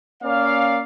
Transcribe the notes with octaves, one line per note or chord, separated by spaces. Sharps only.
A#3 C#4 D5 F5